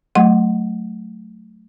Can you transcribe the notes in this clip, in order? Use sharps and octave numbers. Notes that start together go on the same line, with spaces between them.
F#3 A3 F#5 C6